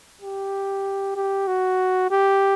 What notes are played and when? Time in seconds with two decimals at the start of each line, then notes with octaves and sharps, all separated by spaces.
0.22 G4
1.16 G4
1.48 F#4
2.11 G4